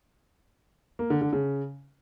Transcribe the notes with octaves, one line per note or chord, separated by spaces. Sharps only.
A#3
D3
D3
C#3